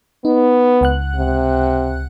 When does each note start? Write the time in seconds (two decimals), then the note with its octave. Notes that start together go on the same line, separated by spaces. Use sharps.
0.25 B3 D#4
0.81 C#2 F#5 F#6
1.16 C3